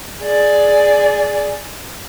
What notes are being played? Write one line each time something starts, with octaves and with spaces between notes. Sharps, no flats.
G#4 D5